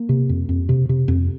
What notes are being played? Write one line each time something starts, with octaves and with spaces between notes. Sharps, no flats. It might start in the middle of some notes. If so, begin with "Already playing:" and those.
Already playing: A#3
C3
F2
F2
C3
C3
F2